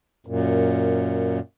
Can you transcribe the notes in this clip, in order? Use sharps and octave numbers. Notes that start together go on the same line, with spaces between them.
F#2 A#2